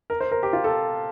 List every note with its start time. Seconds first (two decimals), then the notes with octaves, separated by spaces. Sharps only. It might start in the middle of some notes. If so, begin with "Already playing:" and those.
0.10 A#4
0.21 C5
0.31 A#4
0.43 G4
0.53 F4
0.64 A4